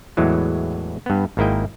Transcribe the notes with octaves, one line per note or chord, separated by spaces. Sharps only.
E2 A2 E3 F#3 G#3
G2 B3
G#1 G#2 A#3 E4 D#5 G5